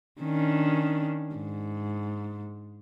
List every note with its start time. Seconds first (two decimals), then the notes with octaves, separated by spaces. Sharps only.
0.22 D#3 C#4 D4
1.35 G#2